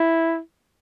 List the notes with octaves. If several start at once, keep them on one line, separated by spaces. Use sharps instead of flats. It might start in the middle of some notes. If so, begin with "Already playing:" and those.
Already playing: E4